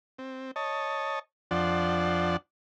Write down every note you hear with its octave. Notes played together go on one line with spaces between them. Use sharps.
C4
C#5 D#5 A5
F2 F3 D4 D5 F#5 C6